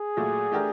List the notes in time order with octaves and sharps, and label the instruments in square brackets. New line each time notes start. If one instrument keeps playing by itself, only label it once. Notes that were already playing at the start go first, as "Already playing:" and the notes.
Already playing: [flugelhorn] G#4
[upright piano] A#2 F#3 A3
A3 D4 G4 A#4